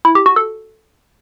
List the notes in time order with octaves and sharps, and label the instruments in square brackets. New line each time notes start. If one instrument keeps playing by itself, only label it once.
[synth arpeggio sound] E4
G4
F#4
A4